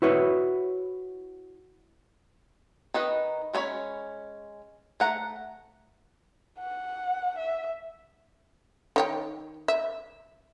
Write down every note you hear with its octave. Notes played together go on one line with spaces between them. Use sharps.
E4 F#4 B4 C#5
D#3 D#4 B4 D#5
G#3 A3 C#4 C#5 B5
A3 F#5 A#5
F#5
E5
D#3 C#5 G5
E5